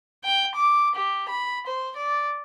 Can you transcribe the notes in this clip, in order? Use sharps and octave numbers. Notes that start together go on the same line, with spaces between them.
G5
D6
G4
B5
C5
D5